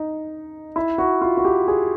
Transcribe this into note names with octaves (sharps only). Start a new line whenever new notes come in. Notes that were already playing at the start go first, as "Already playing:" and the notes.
Already playing: D#4
E4
F#4
F4
F#4
G4
G#4